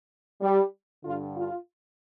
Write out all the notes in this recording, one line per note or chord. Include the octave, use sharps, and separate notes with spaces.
G3
G2 D3 F4
F4